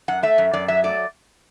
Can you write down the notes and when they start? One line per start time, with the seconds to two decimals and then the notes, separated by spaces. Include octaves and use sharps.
0.08 F#2 F#5
0.23 A3 E5
0.38 F#2
0.53 F#2 D5
0.68 F#3 E5
0.84 A3 D5